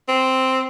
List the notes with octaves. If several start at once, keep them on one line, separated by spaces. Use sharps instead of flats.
C4